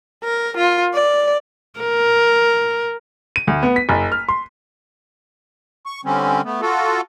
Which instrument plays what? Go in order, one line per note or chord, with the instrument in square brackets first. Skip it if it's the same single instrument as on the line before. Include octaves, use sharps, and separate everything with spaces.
[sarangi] A#4
F4
D5
[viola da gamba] A#4
[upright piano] D#7
D2
B3
B6
F#1
F6
C6
[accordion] C#6
D3 G3 C4 C#4
A3 B3
F4 F#4 A4